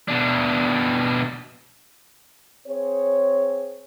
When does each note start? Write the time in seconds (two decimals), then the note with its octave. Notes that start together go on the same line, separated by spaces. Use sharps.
0.08 B2 D4
2.68 C4 G#4 C#5